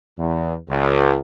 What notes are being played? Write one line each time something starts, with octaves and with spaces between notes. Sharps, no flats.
E2
C#2